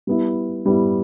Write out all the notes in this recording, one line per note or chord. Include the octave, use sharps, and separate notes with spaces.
G3 B3 E4
G3 B3 E4